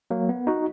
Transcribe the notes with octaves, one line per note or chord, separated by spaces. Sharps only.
F#3 A#3
B3
D#4 F#4